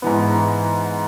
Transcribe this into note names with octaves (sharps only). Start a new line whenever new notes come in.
G#2 E3 B3